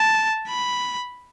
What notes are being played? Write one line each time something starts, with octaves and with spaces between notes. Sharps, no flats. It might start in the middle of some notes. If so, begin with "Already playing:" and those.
Already playing: A5
B5